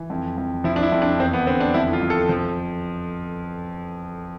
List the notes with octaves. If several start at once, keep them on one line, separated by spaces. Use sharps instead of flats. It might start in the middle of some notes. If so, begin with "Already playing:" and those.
Already playing: E3
F2
F2
F3 E4
D4
E4
F2
D4
E2 C4
B3
D3 C4
D4
F2 E4
F4
F2
A4
F3